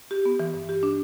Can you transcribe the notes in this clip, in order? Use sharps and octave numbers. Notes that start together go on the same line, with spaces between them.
G4
B3
E3
G2
G4
D4